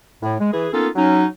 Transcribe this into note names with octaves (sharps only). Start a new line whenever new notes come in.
A2
G#3
E3 G#4
A#3 B3 C#4 D#4 F4 A4
F#3 C#4 D#4